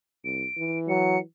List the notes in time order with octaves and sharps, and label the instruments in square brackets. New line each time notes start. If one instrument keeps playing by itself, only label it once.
[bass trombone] C2 [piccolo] D7
[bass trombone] E3
[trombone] F#3 [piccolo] C#7